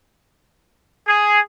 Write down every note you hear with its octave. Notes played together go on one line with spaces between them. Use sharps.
G#4